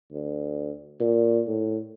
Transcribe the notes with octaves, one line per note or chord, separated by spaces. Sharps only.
D2
A#2
A2